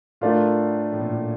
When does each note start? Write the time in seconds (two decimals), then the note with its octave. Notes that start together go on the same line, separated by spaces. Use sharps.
0.21 A2 A3 D4 F4 A#4
0.92 A2
1.00 A#2
1.09 A2